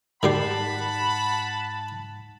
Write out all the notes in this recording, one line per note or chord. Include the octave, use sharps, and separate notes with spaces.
G#2 D#3 G3 G4 F#5 A5 B5 C7